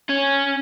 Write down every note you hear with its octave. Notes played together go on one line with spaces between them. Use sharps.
C#4